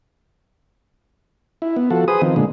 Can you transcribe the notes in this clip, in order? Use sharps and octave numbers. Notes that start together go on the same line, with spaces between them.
E4
B3
F3 F#4 A4
G#4 B4 C5 D#6
D#3 F3 C4
A#2 D3 G#3